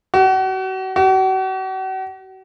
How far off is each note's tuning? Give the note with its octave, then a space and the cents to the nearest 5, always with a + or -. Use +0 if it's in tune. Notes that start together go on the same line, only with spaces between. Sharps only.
F#4 +35
F#4 +40